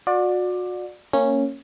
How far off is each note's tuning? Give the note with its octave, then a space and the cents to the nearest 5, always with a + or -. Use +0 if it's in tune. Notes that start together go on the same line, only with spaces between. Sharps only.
F#4 -35 D5 +15
A#3 -20 C#4 -10